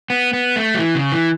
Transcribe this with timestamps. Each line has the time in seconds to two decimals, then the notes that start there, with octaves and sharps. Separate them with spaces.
0.10 B3
0.33 B3
0.56 A3
0.74 F#3
0.79 E3
0.95 C#3
1.12 E3